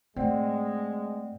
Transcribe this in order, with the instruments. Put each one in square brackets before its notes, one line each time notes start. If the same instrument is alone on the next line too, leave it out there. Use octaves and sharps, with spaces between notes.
[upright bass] A2 [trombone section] G#3 [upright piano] C4 [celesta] D5 F#5 G5